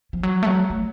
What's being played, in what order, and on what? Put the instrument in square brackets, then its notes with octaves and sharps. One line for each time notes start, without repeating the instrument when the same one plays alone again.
[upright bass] F3
F#3
A3
F#3
A3